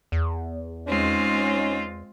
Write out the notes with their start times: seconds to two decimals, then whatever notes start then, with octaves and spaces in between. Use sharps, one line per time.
0.12 E2
0.88 G#3 C4 C#4 D#4 F4